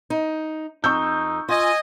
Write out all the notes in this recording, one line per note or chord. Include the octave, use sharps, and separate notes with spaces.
D#4
F2 D#4 C#6 E6 G6
F4 D#5 G#5